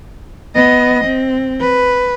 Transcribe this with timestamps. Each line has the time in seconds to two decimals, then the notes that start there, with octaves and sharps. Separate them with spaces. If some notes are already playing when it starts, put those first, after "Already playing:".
0.55 B3 D#5
1.05 C4
1.60 B4